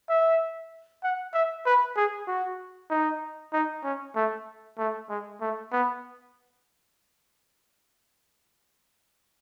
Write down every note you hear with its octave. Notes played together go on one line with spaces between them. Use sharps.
E5
F#5
E5
B4
G#4
F#4
D#4
D#4
C#4
A3
A3
G#3
A3
B3